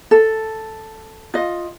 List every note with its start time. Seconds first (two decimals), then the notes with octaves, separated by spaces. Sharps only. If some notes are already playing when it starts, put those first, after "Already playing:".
0.11 A4
1.34 F4 D#5